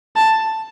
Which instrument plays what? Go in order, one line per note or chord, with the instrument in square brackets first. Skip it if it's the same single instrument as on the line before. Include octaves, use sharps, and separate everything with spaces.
[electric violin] A5